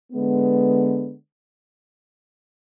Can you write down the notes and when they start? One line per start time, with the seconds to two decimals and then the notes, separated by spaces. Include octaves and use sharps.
0.13 D3 G#3 B3